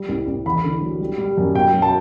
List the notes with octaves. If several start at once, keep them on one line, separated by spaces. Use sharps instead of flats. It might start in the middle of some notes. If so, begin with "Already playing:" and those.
Already playing: G3
C2
C2
E2 B5
D3
F#3
G3
G3
F#2
B2 G5
F#3
A5